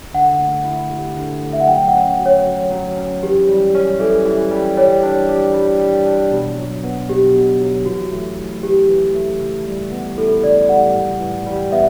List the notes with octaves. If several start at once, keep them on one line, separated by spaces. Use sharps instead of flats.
D3 F#5
A3
E4
G4
D3
A3
E5
F#5
F#3 G5
F#5
C#4
F#4
C#5
F#3
F#3
C#4
E3 G4
G3
C#4
E3 A4
E3
G3
G3 C#5
D4
G4
G3
G3
D4
B2
F#3
B3
B2 G4
B2
F#3
E3 F#4
A3
E4
E3 G4
E3
A3
C#3
G3
B3
E4 A4
C#3 D5
G3 F#5
A2
E3
G3
B3 E5